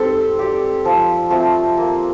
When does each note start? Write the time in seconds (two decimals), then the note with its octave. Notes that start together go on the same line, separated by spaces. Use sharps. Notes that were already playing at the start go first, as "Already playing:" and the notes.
Already playing: G3 C4 G4 A4 C5
0.39 G4 D5
0.85 F3
1.30 A3 C4 F4
1.77 A#3